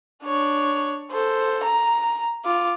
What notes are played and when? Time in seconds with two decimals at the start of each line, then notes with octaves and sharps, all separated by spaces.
0.24 D4 C#5
1.12 A4 C5
1.64 A#5
2.45 F4 D6